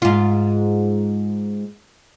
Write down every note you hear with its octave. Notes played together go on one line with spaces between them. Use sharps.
G#2 F4